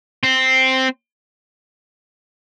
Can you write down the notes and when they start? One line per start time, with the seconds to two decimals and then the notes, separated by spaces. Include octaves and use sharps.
0.23 C4